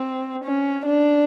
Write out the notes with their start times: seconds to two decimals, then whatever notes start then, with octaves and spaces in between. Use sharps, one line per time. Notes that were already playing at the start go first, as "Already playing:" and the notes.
Already playing: C4
0.44 C#4
0.85 D4